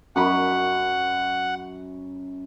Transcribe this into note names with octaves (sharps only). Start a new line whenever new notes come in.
F#2 F#5 B5